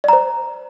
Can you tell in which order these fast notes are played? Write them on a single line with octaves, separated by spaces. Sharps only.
D5 A#5 C5